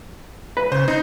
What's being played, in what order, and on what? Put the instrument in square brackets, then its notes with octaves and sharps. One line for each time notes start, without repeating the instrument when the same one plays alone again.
[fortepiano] B4
[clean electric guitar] C#3 [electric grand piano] C5
[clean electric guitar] C4 [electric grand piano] D#4